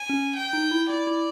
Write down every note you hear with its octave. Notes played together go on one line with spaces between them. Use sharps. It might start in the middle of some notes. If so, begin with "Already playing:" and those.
Already playing: G#5
C#4
G5
D#4
E4
E4 D5
E4